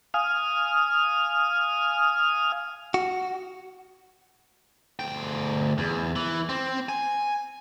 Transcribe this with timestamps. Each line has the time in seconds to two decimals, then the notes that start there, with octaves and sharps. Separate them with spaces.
0.14 F5 G#5 D#6 F6
2.94 F#4
4.99 D2 G5
5.78 E2
6.16 E3
6.49 C4
6.89 G#5